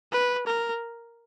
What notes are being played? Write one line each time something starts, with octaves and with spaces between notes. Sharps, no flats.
B4
A#4